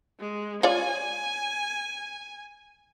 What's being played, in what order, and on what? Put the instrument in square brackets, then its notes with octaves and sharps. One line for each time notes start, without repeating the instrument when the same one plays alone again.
[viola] G#3
[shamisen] F4 C#5 D5 [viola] G#5